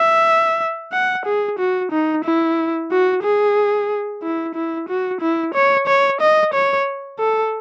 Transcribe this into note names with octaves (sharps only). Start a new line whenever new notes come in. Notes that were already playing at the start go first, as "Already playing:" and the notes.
Already playing: E5
F#5
G#4
F#4
D#4
E4
F#4
G#4
E4
E4
F#4
E4
C#5
C#5
D#5
C#5
A4